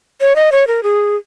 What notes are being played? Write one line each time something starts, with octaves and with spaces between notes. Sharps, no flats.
C#5
D#5
C#5
A#4
G#4